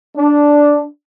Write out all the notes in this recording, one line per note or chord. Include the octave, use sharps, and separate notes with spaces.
D4